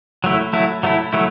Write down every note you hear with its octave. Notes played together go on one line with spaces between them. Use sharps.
F#3 A3 E4
F#3 A3 E4
F#3 A3 E4
F#3 A3 E4